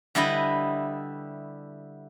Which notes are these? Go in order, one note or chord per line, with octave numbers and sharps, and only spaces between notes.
D3 G3 E4 B4 D#5